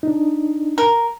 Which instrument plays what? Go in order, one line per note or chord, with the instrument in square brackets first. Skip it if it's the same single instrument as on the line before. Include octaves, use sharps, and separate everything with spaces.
[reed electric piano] D4 D#4
[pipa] A#4